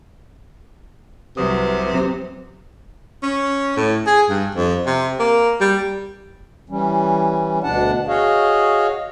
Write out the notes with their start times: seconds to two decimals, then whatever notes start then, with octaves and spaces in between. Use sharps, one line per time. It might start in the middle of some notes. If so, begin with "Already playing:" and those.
1.37 C2 C3 F#3 B4 D#6
1.93 F#3 C4
3.23 C#4
3.77 A2
4.06 G#4
4.29 G2
4.55 F2
4.86 C3
5.19 A#3
5.61 G3
6.69 E3 G3 C#4
7.64 D2 B2 D4 F#5 A5
8.08 F#4 G#4 C#5 D#5 F5